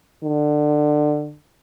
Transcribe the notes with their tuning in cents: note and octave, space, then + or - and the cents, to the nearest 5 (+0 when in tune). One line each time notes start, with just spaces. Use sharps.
D3 +20